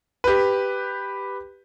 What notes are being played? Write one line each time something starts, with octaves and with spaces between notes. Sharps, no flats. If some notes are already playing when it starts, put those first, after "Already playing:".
G4 B4